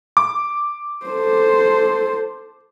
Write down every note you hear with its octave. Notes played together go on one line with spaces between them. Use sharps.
D6
A4 C5